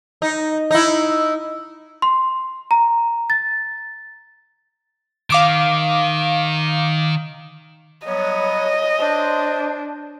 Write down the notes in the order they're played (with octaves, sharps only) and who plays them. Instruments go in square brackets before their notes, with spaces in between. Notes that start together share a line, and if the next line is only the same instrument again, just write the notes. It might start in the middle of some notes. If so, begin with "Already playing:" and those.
[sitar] D#4
D#4 E4
[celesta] C6
A#5
A6
[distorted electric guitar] D#3 [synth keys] F5 D6 D7
[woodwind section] F#3 G3 B3 [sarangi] C#5 [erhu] D#5
[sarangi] D4 [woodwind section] C5